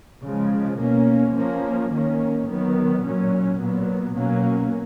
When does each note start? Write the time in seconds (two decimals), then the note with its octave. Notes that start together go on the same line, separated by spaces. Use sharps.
0.24 C#3 F3 G#3
0.80 B2 A#3 C#4
1.36 F3 A#3 C#4
1.92 D#3 A#3 C#4
2.48 D#3 F#3 B3
3.04 A#2 F#3 C#4
3.60 A#2 F#3 B3
4.16 B2 F#3 A#3 C#4